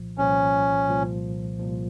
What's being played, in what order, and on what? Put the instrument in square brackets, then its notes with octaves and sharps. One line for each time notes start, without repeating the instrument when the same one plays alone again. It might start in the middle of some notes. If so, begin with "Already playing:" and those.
Already playing: [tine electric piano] C2 A#2 F3
[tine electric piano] C2 A#2 F3 [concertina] C#4
[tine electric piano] C2 A#2 F3
C2 A#2 F3